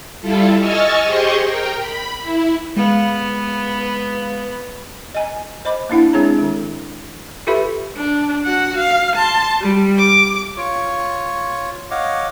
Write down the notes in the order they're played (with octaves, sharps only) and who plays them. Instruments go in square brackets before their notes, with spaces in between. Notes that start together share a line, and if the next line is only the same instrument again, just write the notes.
[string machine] G3 E4 F4 A4
D#5 G#5 C#6 E6 F6 A6
G4 G#4 C5 D#5 C6 C#6
A#4 G5
B5
E4
[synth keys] G#3 F5 [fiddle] B3
[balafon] D#5 G#5 A#5
C5 D#5 B5 D6
A#3 D4 E4 F#5
G#3 C4 D4 G#4 C#5 A#5
D#3 G#3
F4 G4 A4 B4 E5 B5
[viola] D4
F#4 F#5
F5
A5 C6
G3
D6
[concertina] F4 C#5 C#6
C#5 D#5 F5 F#5 D6